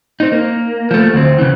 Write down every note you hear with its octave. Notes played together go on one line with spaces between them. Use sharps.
C4 D#4
A#3
F3 A3
D2 C4
C#3 E3